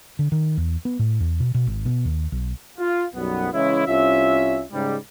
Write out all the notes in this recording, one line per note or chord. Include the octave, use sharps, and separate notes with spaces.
D3
D#3
E2
B3
A2
E2
B2
B2
G#1
B2
D#2
B1
F4
B1 F#2 G3 B3
C#3 E3 G#3 C#4 E4
C2 C#4 F4 E5
G#2 C#3 G3